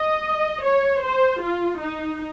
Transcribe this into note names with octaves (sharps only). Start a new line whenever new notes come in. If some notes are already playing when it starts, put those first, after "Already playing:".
Already playing: D#5
C#5
C5
F4
D#4